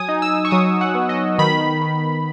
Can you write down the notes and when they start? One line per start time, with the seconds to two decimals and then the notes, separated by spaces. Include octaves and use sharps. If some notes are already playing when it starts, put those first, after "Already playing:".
Already playing: F#3 G#5 D#6
0.08 D#4
0.22 E6
0.45 C#6
0.51 F#3 D#6
0.81 F#5
0.95 B3
1.09 D#5
1.39 D#3 B5
1.82 D#3